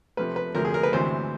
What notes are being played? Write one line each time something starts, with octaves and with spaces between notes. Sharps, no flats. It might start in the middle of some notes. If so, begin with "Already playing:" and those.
C3 F3 A3 B4
B4
D2 C3 F3 A3 A#4
G#4
A#4
B4
D2 C3 E3 G#3 C5